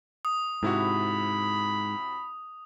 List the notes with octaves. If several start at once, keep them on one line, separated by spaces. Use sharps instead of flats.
D#6
G#2 C3 E4 F#4 B5